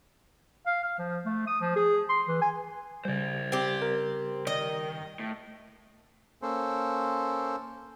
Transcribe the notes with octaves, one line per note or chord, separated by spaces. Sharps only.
F5
F5
F3
A3
D#6
F3
G#4
C6
E3
G#5
C#3 G3 C5 D5
C4 G4
A#4
D#3 D#5
A2
A#3 C#4 A4 C5